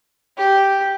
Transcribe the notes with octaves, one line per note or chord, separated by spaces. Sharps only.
G4